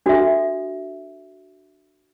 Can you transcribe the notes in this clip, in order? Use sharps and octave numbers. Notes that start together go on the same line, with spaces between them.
D4 F#4 A4 E5